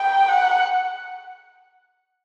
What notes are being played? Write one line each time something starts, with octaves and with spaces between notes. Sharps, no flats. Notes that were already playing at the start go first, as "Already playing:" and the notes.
Already playing: G5
F#5